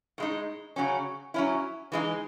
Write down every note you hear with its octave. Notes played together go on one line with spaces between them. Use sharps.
A2 G#3 D#4
C#3 F#3 C#4
F#3 C#4 E4
E3 G#3 D#4